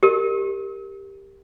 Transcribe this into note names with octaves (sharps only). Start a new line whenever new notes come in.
G4 A#4